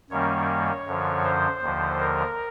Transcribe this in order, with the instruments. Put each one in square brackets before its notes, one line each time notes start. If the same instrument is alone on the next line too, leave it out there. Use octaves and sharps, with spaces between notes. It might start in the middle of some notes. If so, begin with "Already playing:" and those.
[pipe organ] F#2 D#3 G3 A#3 C#4 C#5
F#2 D3 F3
C5
D#2 D3 F3
A#4